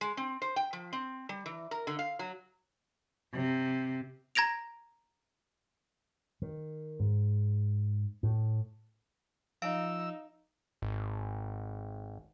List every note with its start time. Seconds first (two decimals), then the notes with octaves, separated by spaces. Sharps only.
0.01 G#3
0.17 C4
0.42 C5
0.56 G5
0.73 F3
0.93 C4
1.29 G3
1.46 E3
1.71 A#4
1.87 D3
1.99 F5
2.19 F#3
3.34 C3
4.35 A#5 G#6 A#6 D7 F7
6.42 D#3
7.00 G#2
8.23 A2
9.62 F3 D#4 F5 E6 D7
10.82 G#1